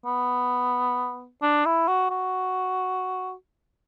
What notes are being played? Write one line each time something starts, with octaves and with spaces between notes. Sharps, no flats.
B3
D4
E4
F#4
F#4